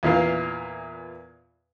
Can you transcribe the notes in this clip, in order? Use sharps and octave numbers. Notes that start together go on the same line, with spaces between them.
E2 A#2 E3 F5